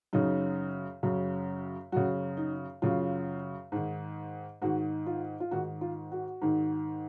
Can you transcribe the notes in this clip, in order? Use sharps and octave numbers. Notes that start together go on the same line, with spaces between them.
F#2 C#3 D#4
F#2 C#3
F#2 C#3 F#4
D#4
F#2 C#3 F4
G#2 D#3
G#2 D#3 F#4
F4
F4
G#2 D#3 F#4
F4
F#4
G#2 D#3